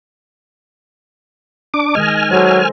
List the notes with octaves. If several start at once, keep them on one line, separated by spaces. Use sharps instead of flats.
D4 D6
D#3 G#3 D#5 G#5 F6
F#3 G#4 A4 C5